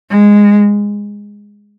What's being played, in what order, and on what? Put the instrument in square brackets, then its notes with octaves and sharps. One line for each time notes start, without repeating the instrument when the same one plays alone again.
[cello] G#3